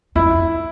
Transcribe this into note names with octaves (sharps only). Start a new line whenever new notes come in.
F2 E4